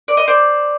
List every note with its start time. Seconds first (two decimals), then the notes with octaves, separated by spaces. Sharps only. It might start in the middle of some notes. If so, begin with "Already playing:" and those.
0.08 D5
0.17 D#5
0.28 C5 D5